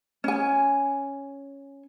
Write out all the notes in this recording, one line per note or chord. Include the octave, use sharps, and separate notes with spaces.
C#4 G#5